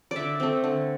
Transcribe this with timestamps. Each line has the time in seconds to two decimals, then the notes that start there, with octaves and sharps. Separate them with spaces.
0.11 D3 D5 E5
0.40 A3 C4
0.64 D3